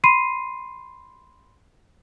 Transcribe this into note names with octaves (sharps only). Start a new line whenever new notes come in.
B5 C6 C7 D#7